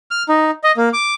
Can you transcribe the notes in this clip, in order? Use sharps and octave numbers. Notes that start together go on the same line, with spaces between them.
F6
D#4
D#5
A#3
D6